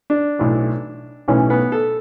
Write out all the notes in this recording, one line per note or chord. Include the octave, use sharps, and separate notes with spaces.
D4
B1 A2 E3
B1 A2 E3 C#4
B3
A4